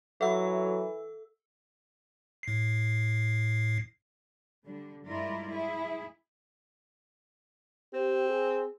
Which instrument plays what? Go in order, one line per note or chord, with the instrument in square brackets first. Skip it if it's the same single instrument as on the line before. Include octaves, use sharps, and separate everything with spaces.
[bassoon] E3 [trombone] F#3 [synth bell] A4 E6 [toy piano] E5 F#5 B5
[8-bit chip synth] A2 C7
[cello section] D3 G3 D4
G2 G#3 E4 F4 A#4 D5
E4 G#4
[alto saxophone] C4 [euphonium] G4
[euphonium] G#4